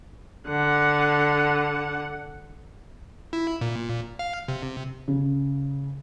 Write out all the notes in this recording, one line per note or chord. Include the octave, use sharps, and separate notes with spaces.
D3 F#5
E4
A#2
F5
C3
C#3